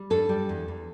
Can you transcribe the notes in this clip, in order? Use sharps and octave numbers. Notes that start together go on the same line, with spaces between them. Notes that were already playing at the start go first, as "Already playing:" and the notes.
Already playing: G3
G2 A4
G3
E2
E2